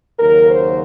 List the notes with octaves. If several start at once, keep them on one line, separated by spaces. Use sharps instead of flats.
D#2 C#3 F#3 A#4
C5